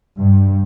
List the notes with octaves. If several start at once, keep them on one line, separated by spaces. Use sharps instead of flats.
G2